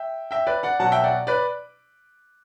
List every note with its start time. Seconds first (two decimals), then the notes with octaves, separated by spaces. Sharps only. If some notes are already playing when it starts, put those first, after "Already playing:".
Already playing: E5 G5
0.31 E5 G5
0.47 B4 D5
0.63 D5 F#5
0.80 B2 F#3 F#5 A5
0.92 E5 G5
1.04 D5 F#5
1.27 B4 D5